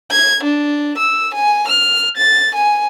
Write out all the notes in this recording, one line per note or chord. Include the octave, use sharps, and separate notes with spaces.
G#6
D4
E6
G#5
F6
A6
G#5